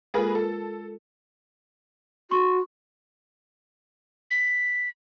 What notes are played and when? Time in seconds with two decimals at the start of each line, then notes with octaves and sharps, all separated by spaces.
0.14 G#3 A#3 F4 G#4 A4 B4
0.35 F4 A4 A#4
2.31 F#4 C6 C#6
4.31 B6